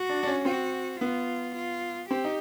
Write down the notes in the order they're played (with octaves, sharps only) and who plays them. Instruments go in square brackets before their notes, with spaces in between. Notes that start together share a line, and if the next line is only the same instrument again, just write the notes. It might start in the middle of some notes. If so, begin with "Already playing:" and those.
Already playing: [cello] F#4
[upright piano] D4
D4
C#4
[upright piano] C4 [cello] F#4
[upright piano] B3 [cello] F4
[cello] F4
[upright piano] C4 [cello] G4
[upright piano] D#4